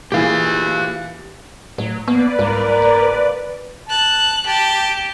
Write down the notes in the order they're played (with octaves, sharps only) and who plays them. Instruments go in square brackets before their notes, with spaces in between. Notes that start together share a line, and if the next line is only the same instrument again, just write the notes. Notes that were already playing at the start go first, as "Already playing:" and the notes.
[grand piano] A#2 E3 G#4 [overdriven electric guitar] G4 F5
[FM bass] A2 [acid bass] F#3
[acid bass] A#3 [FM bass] B3 [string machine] B4 D5
[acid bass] C2 [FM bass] G#2 [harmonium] A#3 A#4
[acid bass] F#1
[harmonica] A5 [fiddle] F#6
[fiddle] G4 [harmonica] A5